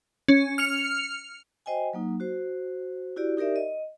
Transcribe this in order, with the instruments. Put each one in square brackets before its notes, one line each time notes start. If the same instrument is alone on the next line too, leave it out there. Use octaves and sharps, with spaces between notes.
[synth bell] C#4
F6 C#7 F7
[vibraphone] F#4 C5 D#5 G5 G#5
F#3 A#3 D#4
F#4 C5
E4 F#4 G4 D5
D#4 G4 A#4 D5 E5
D#5